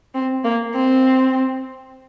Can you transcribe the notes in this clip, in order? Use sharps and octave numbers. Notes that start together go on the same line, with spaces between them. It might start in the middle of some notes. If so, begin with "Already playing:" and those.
C4
A#3
C4